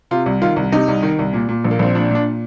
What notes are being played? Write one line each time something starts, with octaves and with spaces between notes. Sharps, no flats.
C3 F4
C2
D#3 F4
C2
C3 D#4
C2
D#3
C2
A#2
A#2
A#1
A#3
A#1 C4
A#2 D4
A#2
D4